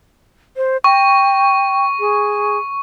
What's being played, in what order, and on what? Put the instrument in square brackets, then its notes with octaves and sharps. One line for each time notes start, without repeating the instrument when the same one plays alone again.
[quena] C5
[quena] G5 [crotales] C#6
[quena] G#4